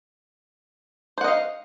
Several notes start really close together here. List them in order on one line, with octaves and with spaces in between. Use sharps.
C5 F#5 D#5 F5